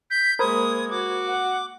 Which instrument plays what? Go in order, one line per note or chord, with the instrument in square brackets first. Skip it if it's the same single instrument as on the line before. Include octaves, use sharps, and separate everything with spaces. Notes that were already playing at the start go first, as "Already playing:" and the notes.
[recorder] G6 [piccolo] B6
[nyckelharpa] G#3 A#3 [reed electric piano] A#4 C5 B5 [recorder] D#6 [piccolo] G#6
[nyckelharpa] F#4 [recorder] D6
[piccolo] F#5